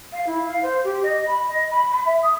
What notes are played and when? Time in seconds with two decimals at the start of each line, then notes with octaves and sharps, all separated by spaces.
0.12 F5
0.27 E4
0.47 F5
0.63 C5
0.84 G4
1.03 D#5
1.27 B5
1.49 D#5
1.71 B5
1.90 B5
2.06 E5
2.23 D#6